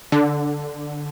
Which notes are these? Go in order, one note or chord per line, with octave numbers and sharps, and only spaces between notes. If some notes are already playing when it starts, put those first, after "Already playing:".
D3